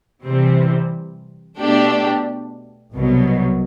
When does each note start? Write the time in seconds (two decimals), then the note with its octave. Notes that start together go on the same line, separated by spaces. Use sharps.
0.24 C3 E3 G3 C4
1.58 B2 A3 D4 G4
2.93 C2 B2 F#3